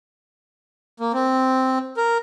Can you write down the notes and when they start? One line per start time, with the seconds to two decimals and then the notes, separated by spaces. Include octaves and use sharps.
1.00 A#3
1.13 C4
1.97 A#4